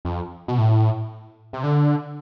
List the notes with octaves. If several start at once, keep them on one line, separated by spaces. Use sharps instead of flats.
F2
B2
A2
C3
D3